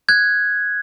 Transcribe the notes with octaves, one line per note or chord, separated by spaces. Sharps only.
F#6 G#6